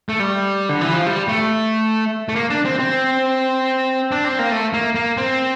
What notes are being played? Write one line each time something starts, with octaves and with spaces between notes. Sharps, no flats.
A3
G3
D3
E3
F3
G3
A3
A3
A#3
D4
C4
C4
D4
C4
A#3
A3
A#3
A#3
C4